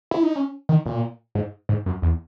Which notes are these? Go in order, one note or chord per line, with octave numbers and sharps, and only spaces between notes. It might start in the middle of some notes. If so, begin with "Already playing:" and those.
E4
D#4
C#4
D#3
A#2
G#2
G#2
F#2
E2